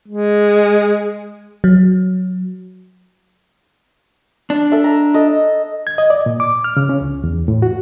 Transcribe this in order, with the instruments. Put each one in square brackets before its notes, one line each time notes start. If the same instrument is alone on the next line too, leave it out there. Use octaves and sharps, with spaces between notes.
[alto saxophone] G#3
[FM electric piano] F#3
[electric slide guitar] D4
[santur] A4 E5
A#5
A4 D#5
[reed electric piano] G#6
D#5
D5
A#2
D6
F6
C#3
C#4
C#2
E2
A2
F#4